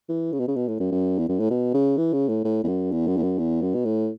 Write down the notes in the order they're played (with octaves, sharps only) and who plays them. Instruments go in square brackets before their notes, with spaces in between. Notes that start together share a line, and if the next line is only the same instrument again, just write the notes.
[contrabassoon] E3
C#3
B2
C#3
B2
A2
F#2
F#2
E2
F#2
A2
B2
C#3
E3
C#3
A2
A2
E2
F#2
E2
F#2
E2
F#2
E2
F#2
B2
A2